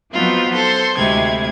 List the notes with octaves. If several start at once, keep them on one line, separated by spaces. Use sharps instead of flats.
F3 F#3 B3 C4 D#4 F4
A4 C5 C6
D2 C3 G#3 C4 E4 G#6